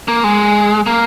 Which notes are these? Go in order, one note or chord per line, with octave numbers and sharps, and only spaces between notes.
A#3
G#3
A#3